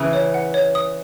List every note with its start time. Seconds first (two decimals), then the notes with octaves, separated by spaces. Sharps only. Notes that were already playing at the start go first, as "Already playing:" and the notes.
Already playing: C#3 E3
0.13 C#5
0.34 F#5
0.54 C#5
0.75 D#6